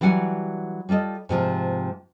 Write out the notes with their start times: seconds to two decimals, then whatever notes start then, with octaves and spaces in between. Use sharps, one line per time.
0.01 E3 F#3 G3 F#5 G#5
0.89 G3 F4 A4 D#5
1.29 G#2 C3 F3 F4